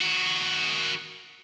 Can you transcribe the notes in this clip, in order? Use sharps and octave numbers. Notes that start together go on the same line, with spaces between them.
D#3 F#4